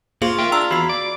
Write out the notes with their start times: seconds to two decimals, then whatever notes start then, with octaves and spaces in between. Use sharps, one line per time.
0.22 A#3 F4 G#4 C5
0.39 A#4 E5 G5
0.52 D4 A#5 E6
0.71 E2 F#4 B5 C7
0.89 D5 D6